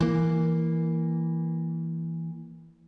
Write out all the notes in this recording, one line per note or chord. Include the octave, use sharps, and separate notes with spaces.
E3 A#3